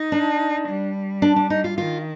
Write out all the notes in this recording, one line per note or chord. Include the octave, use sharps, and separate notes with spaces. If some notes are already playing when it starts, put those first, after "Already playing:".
Already playing: D#4
D4
G3
D4
D4
D#4
F4
D#3 F4